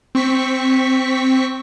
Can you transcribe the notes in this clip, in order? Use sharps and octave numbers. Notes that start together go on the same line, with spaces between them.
C4 C#6 B6